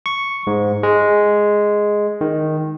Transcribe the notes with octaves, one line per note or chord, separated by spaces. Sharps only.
C#6
G#2
G#3
D#3